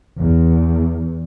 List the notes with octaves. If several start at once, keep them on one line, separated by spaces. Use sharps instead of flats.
E2